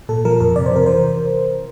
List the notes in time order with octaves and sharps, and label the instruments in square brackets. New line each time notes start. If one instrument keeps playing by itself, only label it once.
[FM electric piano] A#2 A4
F3 A#4
F2 A#4
C3 D5
C5
C3 A#4
E3 C5